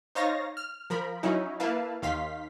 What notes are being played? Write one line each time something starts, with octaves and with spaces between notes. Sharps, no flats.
D#4 C5 C#5 F5 A6 A#6
F6
F3 A#4 B5
F#3 C#4 D#4 E4
A#3 E4 B4 F5 A5
D#2 D#3 F5 C6 B6